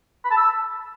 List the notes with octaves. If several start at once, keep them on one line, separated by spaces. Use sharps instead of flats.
B5
A5
E6